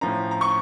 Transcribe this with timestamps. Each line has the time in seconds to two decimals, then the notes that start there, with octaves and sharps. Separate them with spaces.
0.01 A2 F3 C#4 A#5
0.31 A#5
0.41 C#6